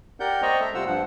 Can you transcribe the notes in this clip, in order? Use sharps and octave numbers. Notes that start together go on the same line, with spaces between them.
G4 A#4 D5 F#5 G6
C5 D5 D#5 G5 A#5 C#6
A4 E5 A#5
C3 G3 F4 C5 F#5 E6
G2 F3 F#5